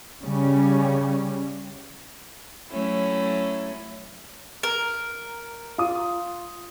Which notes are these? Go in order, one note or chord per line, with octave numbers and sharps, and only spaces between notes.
C#3 G3 C#4
F#3 A3 C#4 E4
A#4
F4 D#6